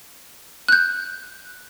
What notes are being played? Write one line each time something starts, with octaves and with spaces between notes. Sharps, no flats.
F#6 G6